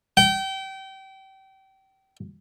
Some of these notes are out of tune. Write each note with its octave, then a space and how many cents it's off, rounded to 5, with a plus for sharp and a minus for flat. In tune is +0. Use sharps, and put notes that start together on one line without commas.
G5 -30